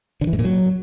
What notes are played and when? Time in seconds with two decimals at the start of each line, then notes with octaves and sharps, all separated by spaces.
0.21 D3
0.27 E3
0.33 G#2
0.39 A#2
0.45 F#3